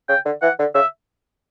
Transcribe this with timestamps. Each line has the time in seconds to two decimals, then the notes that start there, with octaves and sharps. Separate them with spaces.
0.09 C#3 G5
0.25 D3
0.42 E3 F#5
0.59 D3
0.75 C#3 E5